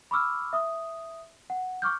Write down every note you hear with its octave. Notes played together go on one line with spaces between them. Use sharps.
B5 C#6 D6 E6 F6
E5 D#6
F#5
C#6 D6 F6 G6